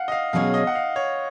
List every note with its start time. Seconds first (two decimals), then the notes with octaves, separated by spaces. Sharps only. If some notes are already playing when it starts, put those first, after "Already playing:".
Already playing: F5 F#5
0.08 D#5
0.12 F5
0.33 B2 F#3 C#4 G#4 C#5 F5
0.54 D#5
0.67 F#5
0.75 F5
0.96 C#5